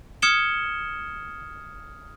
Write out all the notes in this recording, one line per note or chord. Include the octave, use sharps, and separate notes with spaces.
D#6 F6 G#6 C#7 E7 G7